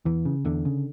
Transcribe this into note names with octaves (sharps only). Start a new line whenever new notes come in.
E2 E3
C#3
E2 D3
C#3